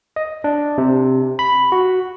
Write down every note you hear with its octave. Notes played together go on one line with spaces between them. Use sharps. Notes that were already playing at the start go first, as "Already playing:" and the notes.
D#5
D4
C3
B5
F#4